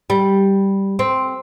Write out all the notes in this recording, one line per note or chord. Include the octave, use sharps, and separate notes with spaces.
G3
C4